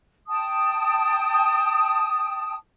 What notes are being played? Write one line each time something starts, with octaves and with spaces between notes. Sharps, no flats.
G5 A5 D#6